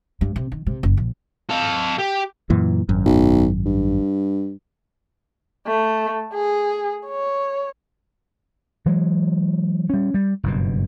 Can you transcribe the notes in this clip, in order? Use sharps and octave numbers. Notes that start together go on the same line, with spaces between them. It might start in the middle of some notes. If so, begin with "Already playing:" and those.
G2
C3
D#3
C3
F#1
A#1
A4 F5
G4
F#2 A#2 E3
G#1 F#2
B1
G2
A3
G#4
C#5
E3 F#3 G#3
G3 C#4
G3
F#1 G2 B2